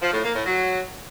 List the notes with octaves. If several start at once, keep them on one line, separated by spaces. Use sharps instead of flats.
F3
A2
A#3
A2
F#3